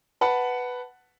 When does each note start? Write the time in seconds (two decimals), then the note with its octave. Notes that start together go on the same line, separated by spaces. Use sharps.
0.21 B4 F#5 A5 B5